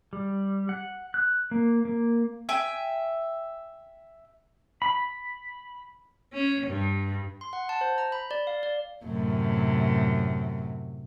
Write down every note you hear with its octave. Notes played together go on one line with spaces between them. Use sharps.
G3
F#5
F#6
A#3
A#3
E5 G5 G#5
B5
C#4
G2
C6
F#5
A5
C5
A#5
B5
D5
F5
D5
F#2 A2 C3